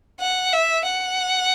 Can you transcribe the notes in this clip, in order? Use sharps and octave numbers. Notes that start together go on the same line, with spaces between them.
F#5
E5
F#5